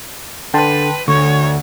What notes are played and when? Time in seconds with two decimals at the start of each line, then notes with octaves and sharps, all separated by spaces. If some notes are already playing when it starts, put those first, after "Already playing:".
0.54 D3 B4 G5 A5 C6
1.08 D2 D3 C#5 C#6